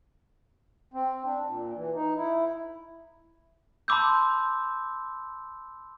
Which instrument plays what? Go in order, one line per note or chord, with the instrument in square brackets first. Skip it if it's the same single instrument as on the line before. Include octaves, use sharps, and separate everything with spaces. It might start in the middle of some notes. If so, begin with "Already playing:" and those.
[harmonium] C4
D4
A#2
E3
D#4
E4
[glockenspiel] A5 B5 C6 D6 E6 G6